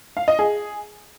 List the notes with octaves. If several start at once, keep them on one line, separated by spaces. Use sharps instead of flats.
F5
D#5
G#4